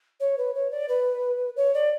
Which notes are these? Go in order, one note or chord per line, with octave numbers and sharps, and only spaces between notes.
C#5
B4
C#5
D5
B4
C#5
D5